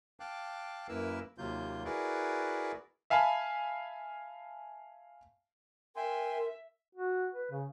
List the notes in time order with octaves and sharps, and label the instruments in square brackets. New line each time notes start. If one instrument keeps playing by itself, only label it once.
[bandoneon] F5 G5 A5 D6 F#6
F#2 A#3 E4 A#4 B4 E6
D#2 C3 F#3 A#3 F4 G6
E4 F#4 G#4 A#4 B4 D5
[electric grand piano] E5 F5 G#5 A5 B5
[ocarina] A#4 [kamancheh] E5 [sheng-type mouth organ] G5 G#5 C6
[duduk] F#4
B4
C#3